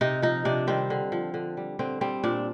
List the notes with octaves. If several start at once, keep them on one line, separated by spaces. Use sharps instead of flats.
C3 D#4
F3 D#4
C3 D4
D#3 G3 C4
D3
F3
D3
G3
D3 C4
G3 C4
A#2 D4